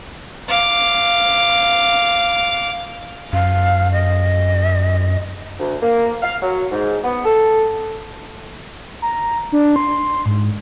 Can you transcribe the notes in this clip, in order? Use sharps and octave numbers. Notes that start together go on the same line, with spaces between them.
F5 D6
F#2 F5
D#5
D2
A#3
F5
F#3
G#2
B3
A4
A#5
D4
C6
G#2